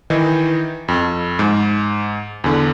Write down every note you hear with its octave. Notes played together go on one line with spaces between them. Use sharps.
D#3 E3 D#4
F2
G#2
E2 D3